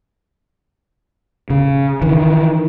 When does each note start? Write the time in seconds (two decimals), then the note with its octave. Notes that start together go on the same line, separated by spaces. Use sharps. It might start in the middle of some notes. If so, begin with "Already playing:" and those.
1.50 C#3
2.02 D#3 E3